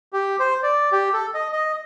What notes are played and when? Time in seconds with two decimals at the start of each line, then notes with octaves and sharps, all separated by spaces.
0.13 G4
0.39 C5
0.63 D5
0.92 G4
1.14 A4
1.34 D#5
1.53 D#5